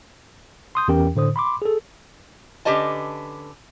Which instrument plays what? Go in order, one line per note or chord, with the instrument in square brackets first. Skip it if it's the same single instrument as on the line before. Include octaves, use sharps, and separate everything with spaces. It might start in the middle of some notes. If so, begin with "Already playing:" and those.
[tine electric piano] C6 D#6 G6
E2 E3 C#4 G4 A#4 G5
A2 D3 C5 D#6
B5 C6 D6
G#4 A4
[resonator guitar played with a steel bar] D3 C#4 G4 B4 D#5 A5